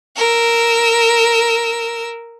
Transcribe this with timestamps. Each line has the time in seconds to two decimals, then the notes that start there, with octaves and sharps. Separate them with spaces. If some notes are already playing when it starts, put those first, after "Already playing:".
0.16 A#4 E6